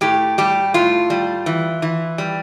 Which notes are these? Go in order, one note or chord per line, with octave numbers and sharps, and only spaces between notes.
A2 G4
G3 G4
A2 F4
G3
E3
E3
G3